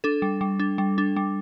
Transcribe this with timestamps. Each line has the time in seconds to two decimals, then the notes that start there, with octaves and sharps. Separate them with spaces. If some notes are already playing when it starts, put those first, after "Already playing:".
0.04 D4 A4
0.22 G3
0.41 G3
0.60 D4
0.78 G3
0.98 D4
1.16 G3